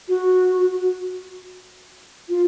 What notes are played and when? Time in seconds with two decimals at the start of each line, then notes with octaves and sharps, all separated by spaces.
0.09 F#4
2.29 F4